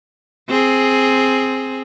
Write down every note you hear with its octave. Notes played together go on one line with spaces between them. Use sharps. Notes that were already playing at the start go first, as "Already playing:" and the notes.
C4 G#4